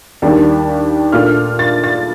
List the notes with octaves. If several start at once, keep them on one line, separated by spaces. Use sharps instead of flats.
D#2 D#3 G3 A#3 D4
A#2 A3 D4 F4 F6
A6
A6